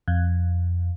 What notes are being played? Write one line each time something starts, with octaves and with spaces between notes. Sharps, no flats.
F2